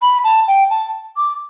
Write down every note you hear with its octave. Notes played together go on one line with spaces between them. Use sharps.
B5
A5
G5
A5
D6